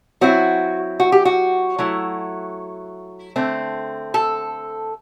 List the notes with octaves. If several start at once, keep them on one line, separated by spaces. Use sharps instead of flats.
F#3 C4 E4 F#4
F#4
G4
F#4
F#3 A3 E4
D3 A3 C4
A4